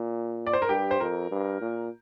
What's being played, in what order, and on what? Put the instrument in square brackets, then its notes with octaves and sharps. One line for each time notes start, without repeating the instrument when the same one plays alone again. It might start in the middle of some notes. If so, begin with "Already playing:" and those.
Already playing: [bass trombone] A#2
[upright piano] D5
C5
A#4
[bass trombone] G2 [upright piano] G4
[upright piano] C5
[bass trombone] F2 [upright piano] A#4
[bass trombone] G2
A#2